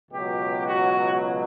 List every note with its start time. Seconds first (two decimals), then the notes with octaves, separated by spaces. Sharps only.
0.10 C#2 B2 F#3 G4
0.65 F#4